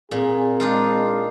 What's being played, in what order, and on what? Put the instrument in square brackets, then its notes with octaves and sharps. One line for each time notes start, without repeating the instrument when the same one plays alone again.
[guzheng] A#2 [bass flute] C4 [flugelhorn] G#4
[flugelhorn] G#3 [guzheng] D4 D#4 F4